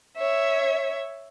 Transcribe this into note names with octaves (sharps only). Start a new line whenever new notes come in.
C#5 E5